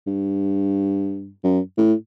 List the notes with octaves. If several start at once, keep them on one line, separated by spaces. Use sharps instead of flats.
G2
F#2
A2